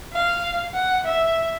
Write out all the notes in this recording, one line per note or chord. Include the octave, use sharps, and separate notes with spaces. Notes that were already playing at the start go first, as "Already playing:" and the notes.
F5
F#5
E5